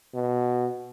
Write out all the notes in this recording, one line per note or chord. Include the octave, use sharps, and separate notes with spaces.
B2